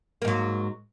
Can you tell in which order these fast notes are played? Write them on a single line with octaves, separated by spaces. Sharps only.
A#3 G#2 F#3